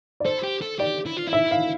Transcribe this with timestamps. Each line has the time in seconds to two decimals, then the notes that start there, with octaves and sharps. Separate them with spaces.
0.20 D5
0.25 A4 C5
0.43 G4
0.62 A4
0.79 G4 D5
1.06 E4
1.17 F4
1.27 E4
1.33 E5
1.51 F5